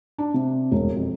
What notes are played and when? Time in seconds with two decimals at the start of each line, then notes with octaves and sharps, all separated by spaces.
0.18 D4
0.34 C3
0.72 E1
0.96 F2